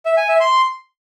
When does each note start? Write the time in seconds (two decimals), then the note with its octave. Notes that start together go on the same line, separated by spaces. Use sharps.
0.06 E5
0.17 G#5
0.29 E5
0.40 C6